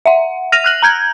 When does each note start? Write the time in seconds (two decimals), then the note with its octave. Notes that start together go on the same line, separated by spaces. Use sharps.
0.06 E5 F#5
0.52 F6 A#6 D#7 F7
0.64 F6 F#6 F#7
0.82 A#5 G6 G#6